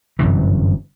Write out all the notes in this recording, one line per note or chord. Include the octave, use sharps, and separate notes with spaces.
G1 F#2 C3 E3